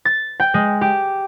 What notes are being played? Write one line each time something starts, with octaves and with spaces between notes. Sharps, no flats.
A6
G5
G#3
G4